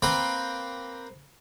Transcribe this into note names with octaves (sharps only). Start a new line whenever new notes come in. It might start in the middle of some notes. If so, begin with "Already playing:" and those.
A#3 C4 B4 G5